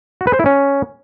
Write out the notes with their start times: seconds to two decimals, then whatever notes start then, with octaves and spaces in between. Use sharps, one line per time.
0.21 F#4
0.27 B4
0.33 C5
0.40 E4
0.46 C#4